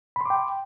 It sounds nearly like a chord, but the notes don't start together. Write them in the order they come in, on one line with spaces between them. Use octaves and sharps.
B5 C6 D6 G5